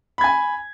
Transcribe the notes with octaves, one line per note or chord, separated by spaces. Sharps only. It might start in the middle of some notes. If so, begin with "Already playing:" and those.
G#5 B5 G#6